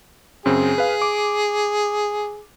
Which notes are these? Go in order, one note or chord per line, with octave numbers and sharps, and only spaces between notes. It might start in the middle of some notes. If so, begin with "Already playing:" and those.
F#2 C#3 C4 G#4
B4 F5
D6